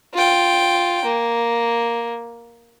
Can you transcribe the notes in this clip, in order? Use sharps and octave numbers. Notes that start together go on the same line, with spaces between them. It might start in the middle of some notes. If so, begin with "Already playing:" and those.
F4 G5
A#3